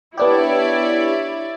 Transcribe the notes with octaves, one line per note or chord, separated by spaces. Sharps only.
B3 D4 E4 G4 C#5 D5